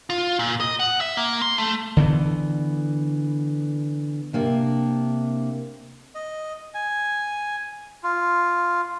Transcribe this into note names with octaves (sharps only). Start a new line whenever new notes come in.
F4
A#2
D#5
F#5
E5
A#3
C6
A3
D3 E3 B3
C3 A#3 D4
D#5
G#5
F4